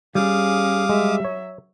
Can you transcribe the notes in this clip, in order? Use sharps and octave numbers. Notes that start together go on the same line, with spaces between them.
G3 C#4 G#4 F5 D6 D#6
F#3 G#3 E5
C#5